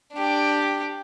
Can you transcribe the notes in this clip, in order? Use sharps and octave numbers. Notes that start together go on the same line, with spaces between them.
D4 G4